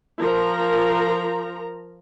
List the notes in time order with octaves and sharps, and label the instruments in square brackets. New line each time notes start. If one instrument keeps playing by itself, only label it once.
[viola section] F3 A#4 A#5